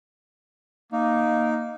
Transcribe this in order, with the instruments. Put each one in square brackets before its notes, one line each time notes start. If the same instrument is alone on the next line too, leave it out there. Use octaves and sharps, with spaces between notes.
[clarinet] A#3 [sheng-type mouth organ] D#4